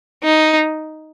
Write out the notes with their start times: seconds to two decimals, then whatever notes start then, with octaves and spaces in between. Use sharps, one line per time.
0.23 D#4